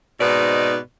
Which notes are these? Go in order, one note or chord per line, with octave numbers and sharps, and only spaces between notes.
G#2 B2 C4 D#4 B4 D5